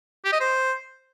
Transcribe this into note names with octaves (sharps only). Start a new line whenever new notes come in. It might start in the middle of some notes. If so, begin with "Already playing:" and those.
G4
D#5
C5